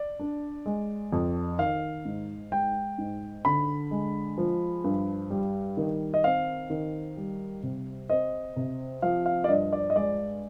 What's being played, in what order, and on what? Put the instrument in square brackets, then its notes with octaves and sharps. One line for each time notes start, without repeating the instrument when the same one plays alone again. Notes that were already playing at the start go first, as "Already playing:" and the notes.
Already playing: [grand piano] D5
[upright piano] D4
G#3
F2
[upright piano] D#3 [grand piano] F5
[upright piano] G#2
[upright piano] G#3 [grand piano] G5
[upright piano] G#2
[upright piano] D3 [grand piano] B5
[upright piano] G#3
F3
G2
G3
D#3
[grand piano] D#5
[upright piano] C4 [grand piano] F5
[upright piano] D#3
G3
C3
[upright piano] C4 [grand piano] D#5
[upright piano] C3
[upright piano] F3 [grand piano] F5
[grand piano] F5
D5
[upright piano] G2 [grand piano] D#5
[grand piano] D5
D#5
[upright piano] G#3 [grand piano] D5